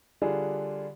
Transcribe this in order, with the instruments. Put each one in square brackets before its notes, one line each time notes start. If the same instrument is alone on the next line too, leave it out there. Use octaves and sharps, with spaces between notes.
[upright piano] D3 G3 D4 F4 G#4